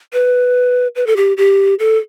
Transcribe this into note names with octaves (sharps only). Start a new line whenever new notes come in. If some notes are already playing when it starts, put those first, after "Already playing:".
B4
B4
A4
G4
G4
A4